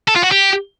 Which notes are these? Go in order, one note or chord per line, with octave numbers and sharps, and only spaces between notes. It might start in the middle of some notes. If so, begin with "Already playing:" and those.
A4
F4
F#4
G4